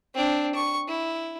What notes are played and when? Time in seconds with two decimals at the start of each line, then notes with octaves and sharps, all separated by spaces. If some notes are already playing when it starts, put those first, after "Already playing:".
0.14 C4 D4
0.55 C#6
0.88 E4